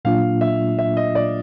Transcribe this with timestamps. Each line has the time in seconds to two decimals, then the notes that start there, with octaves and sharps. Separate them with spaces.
0.05 A#2 F#3 A#3 D4 F4 F5
0.41 E5
0.79 E5
0.97 D#5
1.15 D5